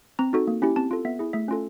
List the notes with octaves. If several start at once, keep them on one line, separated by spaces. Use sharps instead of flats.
C4 A#5
D#4 F#4 A4
A#3
C#4 E4 G4
C4 A5
F4 A4
B3 E5
E4 G#4
A3 E5
C#4 F4 A4